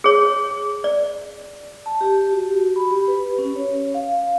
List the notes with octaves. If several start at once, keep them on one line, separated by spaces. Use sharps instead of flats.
G#4 C#5
D5
A5
G4
F#4
B5
G4
B4
C#4
C#5
F5